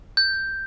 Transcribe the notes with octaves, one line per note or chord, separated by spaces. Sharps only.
G6